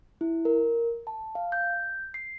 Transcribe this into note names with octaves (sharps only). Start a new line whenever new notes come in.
E4
A#4
A5
F5
G6
C7